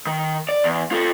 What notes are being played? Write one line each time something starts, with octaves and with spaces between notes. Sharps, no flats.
D#3
D5
E2
F4 A4